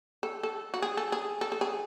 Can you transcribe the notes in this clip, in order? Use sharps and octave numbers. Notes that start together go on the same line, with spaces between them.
A4
A4
F#4
G#4
A4
G#4
A4
A4
G#4